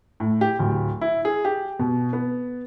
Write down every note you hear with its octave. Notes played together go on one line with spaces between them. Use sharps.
A2
G4
D1
E4
G#4
G4
B2
B3